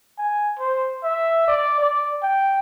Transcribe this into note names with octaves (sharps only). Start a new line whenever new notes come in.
G#5
C5
E5
D5
D5
G5